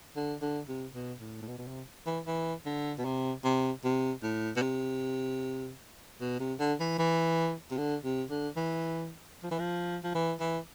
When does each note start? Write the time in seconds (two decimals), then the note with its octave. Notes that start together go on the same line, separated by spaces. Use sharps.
0.16 D3
0.42 D3
0.68 C3
0.95 B2
1.21 A2
1.42 A2
1.47 B2
1.58 B2
1.68 C3
2.06 E3
2.27 E3
2.65 D3
2.98 B2
3.05 C3
3.44 C3
3.84 C3
4.23 A2
4.56 B2
4.62 C3
6.21 B2
6.40 C3
6.60 D3
6.80 E3
6.98 E3
7.71 C3
7.77 D3
8.05 C3
8.30 D3
8.57 E3
9.43 F3
9.51 E3
9.59 F3
10.04 F3
10.15 E3
10.40 E3